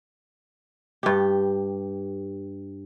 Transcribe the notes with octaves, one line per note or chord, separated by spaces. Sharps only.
G2 G4